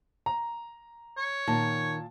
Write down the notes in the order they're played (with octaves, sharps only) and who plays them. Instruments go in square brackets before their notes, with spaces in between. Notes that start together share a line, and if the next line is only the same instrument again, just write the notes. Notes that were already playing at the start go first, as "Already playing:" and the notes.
[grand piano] A#5
[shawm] C#5
[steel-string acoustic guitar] A#2 [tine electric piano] D#3 [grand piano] A5